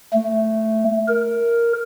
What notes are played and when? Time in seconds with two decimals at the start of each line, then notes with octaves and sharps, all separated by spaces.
0.13 A3
1.08 A#4